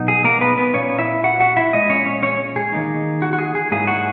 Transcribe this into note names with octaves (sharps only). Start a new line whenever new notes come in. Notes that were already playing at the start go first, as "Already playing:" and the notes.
Already playing: B2 F#3 D#4
G#4
A#3 A#4
B3 B4
B3 B4
A#2 A#3 C#4 C#5
E4 E5
F#4 F#5
F#4 F#5
E4 E5
A#2 G#3 D#5
C#4 C#5
C#4 C#5
C#4 C#5
G#4
D#3 A#3 D#4
F#4
F#4
G#4
G#4
G#2 F#3 A#3 E4 G#4
F#4